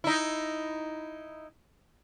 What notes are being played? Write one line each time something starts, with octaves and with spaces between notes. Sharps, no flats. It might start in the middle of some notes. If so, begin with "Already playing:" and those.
D#4 E4